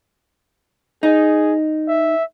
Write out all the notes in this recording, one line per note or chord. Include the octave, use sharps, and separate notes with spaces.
D#4 G#4
E5